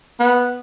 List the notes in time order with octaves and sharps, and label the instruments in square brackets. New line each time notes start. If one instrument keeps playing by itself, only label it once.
[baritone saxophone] B3